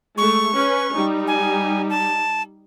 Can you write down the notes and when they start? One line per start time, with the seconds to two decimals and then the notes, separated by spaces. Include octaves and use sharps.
0.18 G#3 A3 C#6
0.55 C#4 B4
0.94 G3 D#4
1.27 G#5
1.90 A5